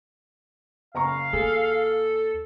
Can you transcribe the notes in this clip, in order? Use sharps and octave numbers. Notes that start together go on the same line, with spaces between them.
F#1 F5 A#5 C#6
D#2 F4 G#4 A4